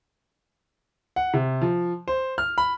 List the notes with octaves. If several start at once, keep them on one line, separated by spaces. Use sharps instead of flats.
F#5
C3
F3
C5
F6
B5